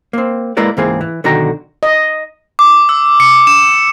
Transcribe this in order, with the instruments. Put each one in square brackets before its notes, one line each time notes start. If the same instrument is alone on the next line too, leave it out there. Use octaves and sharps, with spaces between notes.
[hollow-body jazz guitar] A#3 C4
G#3 A#3 E4 A#4 B4 D5
C#2 G#2 E3 A#3 C4 G#4
E3
B1 D3 D#3 F#4 G5 A#5
[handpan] D#5
[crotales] D6
E6
C#7
E7